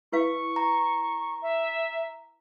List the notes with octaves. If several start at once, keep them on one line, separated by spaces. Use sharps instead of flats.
E4 B4 F5 C#6
A#5
E5